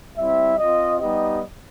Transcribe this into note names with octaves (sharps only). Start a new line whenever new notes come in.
G3 C4 E4 E5
C4 F4 D#5
G3 B3 D#4 G4 D#5